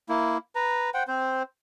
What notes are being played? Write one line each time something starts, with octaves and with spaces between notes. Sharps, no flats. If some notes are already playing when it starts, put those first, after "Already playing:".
A#3 E4
B4 A#5
C5 F#5 G5
C4 C5